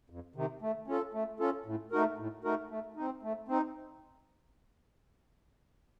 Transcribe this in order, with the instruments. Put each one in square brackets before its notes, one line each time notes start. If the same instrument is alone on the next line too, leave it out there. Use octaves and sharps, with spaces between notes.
[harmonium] F2
C3 D#3
A3
C#4 F4 A4
A3
C#4 F4 A4
A2
A3 D#4 F#4 A#4
A2
A3 D#4 F#4 A#4
A3
C4 D#4
A3
C4 D#4